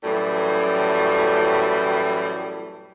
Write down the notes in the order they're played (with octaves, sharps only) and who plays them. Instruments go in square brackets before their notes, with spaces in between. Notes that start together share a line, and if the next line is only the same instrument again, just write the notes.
[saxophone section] F#2 A2 E3 G3